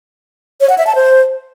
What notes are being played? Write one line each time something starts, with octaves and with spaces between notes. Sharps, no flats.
C#5
F#5
E5
A5
C5